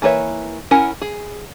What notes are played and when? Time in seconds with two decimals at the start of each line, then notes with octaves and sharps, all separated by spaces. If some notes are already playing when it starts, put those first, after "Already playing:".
0.02 E3 A#3 B4 C#5 E5
0.71 C#4 E4 A#4 F#5 G#5
1.02 G#4